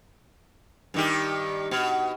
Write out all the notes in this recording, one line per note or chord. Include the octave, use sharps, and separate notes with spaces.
G2 D#3 G4
B2